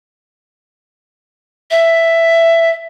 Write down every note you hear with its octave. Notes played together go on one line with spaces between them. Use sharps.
E5